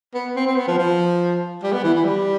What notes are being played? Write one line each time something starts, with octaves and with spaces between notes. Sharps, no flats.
B3
C4
C4
B3
F3
F3
G3
B3
E3
E3
G3